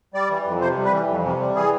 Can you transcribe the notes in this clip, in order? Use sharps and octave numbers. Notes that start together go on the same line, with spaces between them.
G3 D5
E3
F2
C3 C5
G3
B4
E3
F2
C3
G3
E3 G#4